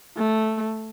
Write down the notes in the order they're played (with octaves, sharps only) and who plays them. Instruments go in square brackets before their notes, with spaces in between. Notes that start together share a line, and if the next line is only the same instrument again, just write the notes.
[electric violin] A3